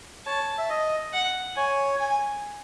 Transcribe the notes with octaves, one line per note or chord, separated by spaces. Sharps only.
C#5 A5
E5
D#5
F#5
C#5 G#5
G#5